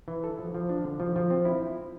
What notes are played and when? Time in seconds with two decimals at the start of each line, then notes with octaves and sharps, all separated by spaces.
0.08 E3
0.24 A4
0.39 F3
0.54 F3
0.69 D4
0.84 D3
1.00 F3
1.16 F3
1.30 C4
1.45 E4